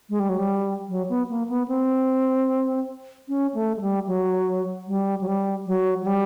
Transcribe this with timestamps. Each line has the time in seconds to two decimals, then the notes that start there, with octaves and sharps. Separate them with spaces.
0.09 G#3
0.20 G3
0.29 F#3
0.39 G3
0.89 F#3
1.09 B3
1.29 A#3
1.49 B3
1.68 C4
3.29 C#4
3.54 A3
3.77 G#3
3.81 G3
4.07 F#3
4.87 G3
5.21 F#3
5.27 G3
5.66 F#3
6.02 F#3
6.06 G3